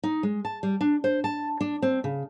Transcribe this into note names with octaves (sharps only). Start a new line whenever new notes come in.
D#4
G#3
A5
G3
D4
C5
A5
D4
C4
C#3